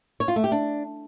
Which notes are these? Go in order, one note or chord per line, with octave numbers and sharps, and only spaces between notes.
C#5
F4
A3
G4
D4